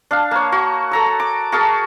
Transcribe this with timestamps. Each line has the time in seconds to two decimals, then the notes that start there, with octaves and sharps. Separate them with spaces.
0.11 D4 F5
0.31 A#3 C#5
0.52 F#4
0.91 A4 A#5 E6
1.20 D6
1.52 F#4 G#4 A#4 A5